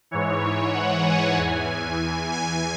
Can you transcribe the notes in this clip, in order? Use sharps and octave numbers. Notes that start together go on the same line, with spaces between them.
G#2 E3 C#5
F#5
G#5
E2 E3 G#5
G#5